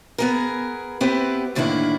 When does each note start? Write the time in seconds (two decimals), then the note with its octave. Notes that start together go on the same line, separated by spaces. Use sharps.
0.18 B3 G#4 A#4
1.01 B3 C4 E4 G4 B4
1.55 A2 D3 D#3 A#3 D4 E4